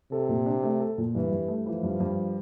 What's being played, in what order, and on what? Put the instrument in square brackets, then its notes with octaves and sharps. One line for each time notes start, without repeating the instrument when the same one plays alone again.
[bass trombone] C3 [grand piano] A4
[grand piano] A#2
D4
A3
A4
A#2
[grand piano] G2 [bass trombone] E3
[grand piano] G2
A3
[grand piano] E3 [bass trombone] F3
[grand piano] G2
G2